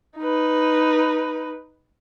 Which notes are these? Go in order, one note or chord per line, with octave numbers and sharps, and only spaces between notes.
D#4 B4